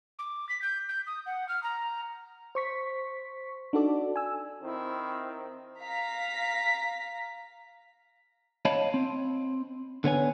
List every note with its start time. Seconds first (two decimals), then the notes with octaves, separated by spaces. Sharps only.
0.19 D6
0.49 B6
0.62 G6
0.89 G6
1.07 D#6
1.26 F#5
1.49 F6
1.63 A#5
2.55 C5 C#6 B6
3.73 D4 D#4 F#4 A4 D5
4.16 G#5 E6
4.63 D#3 C4 E4
5.81 F5 A#5 B6
8.65 C#5 D#5 F5 G5 A5 B5
8.94 C4
10.04 D3 B3 C#5 G#5